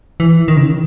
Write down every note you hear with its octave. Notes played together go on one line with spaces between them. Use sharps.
E3
D#3
C#3